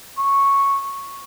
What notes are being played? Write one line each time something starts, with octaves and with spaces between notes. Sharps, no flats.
C#6